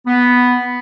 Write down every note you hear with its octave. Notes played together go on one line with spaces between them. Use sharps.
B3